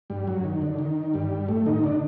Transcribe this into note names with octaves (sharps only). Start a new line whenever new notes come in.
G2 G3
F#2 F#3
D#3
D3
D#3
G2 G3
A2 A3
D#3 D#4
D3 D4